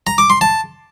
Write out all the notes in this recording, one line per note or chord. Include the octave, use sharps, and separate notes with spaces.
A#5
D6
C6
A5